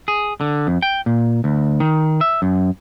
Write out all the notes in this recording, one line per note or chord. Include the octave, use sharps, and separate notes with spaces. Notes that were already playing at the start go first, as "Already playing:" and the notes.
G#4
D3
F2
G5
A#2
D2
D#3
E5
F#2